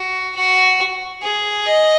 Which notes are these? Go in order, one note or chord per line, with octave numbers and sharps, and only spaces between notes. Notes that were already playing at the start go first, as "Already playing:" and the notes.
Already playing: F#4
F#4
G#4
D#5